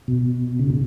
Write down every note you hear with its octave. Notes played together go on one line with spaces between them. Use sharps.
B2
C#3
B2